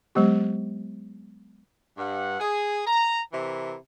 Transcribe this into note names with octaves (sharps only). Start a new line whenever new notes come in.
F#3 G#3 B3 G4
G2 F#5
G#4
A#5
C3 E3 E4 A#4